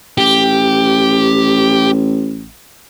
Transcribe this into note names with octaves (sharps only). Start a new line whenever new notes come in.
A1 G4